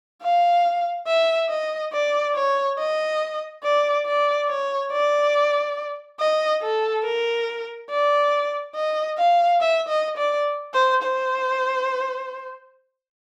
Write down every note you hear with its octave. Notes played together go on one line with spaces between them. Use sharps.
F5
E5
D#5
D5
C#5
D#5
D5
D5
C#5
D5
D#5
A4
A#4
D5
D#5
F5
E5
D#5
D5
C5
C5